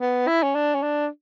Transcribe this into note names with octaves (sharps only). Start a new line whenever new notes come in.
B3
E4
C#4
D4
C#4
D4